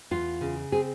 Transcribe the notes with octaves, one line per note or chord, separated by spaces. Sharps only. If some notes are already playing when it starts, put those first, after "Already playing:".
E2 F4
C#3
C4 G#4